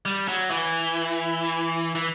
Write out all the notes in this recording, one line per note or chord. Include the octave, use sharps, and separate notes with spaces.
G3
F#3
E3
E3